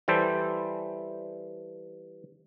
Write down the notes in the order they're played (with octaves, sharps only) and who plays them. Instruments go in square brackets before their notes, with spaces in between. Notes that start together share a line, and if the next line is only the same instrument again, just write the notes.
[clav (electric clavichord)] E3 G3 A4 C5